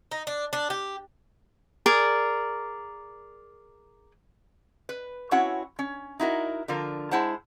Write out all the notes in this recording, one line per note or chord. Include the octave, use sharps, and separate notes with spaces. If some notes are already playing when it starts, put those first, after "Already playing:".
D#4
D4
D4
G4
G#4 A#4 D5
B4
C4 C#4 E4 F#4 C#5 F#5
C#4
D#4 E4 F#4 A#4
D3 F3 F4 A#4
G#3 E4 C5 F#5 A5